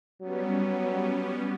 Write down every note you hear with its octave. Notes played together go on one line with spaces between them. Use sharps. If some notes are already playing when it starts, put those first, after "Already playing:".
F#3 G3 B3 C#4